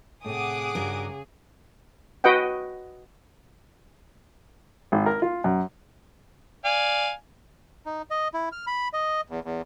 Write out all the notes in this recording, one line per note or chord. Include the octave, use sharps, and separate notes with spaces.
A2 C3 G#4 F#5 D6 D#6
G2 C#3 F#4 A#4
F#4 B4 D#5 F#5 G5
G#1
A#4
F4
F#2
D5 F5 G#5
D#4
D#5
E4
F6
B5
D#5
E2
E2